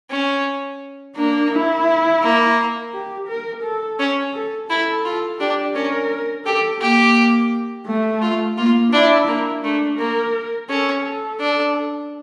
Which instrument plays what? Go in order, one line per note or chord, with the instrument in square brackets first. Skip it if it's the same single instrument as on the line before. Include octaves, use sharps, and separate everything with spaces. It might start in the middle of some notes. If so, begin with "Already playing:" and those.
[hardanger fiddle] C#4
[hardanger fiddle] A#3 [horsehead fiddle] D4
[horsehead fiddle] E4
[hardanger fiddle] A#3
[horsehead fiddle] G4
A#4
A4
[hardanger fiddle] C#4
[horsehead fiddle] A4
[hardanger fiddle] E4 [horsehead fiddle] A4
[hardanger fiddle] F4
[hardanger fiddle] D4 [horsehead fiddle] G4
[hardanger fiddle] C#4 [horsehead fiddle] A#4
[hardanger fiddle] G4 [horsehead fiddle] A4
[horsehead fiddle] A#3 [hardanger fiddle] G4
[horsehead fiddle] A3
[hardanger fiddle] F4
[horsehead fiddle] A#3 [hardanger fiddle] F4
[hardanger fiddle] D4 [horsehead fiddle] E4
[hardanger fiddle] A#3 [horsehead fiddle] E4
[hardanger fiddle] A3 [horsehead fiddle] D4
[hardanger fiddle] A#3 [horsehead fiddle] A#4
[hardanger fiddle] C#4 [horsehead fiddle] A4
[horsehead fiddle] A4
[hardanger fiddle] D4